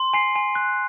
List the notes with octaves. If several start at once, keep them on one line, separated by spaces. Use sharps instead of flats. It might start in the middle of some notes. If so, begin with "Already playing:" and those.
Already playing: C6
G#5 C7
G#5
F#6